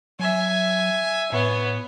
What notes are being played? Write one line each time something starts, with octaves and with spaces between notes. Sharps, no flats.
F#3 E5 G#5
A2 B3 C#5